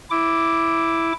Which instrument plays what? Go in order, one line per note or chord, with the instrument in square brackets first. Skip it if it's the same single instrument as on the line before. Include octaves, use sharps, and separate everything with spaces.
[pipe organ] E4 D6